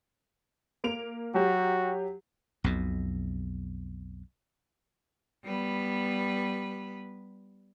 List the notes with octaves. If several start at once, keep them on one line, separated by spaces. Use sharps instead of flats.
A#3 D7 F7
F#3 F#4 G4
B1 F2 B2
G3 B3 B4